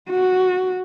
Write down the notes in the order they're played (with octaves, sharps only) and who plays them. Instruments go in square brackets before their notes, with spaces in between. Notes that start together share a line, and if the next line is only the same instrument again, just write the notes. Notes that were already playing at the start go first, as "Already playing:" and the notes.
[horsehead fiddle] F#4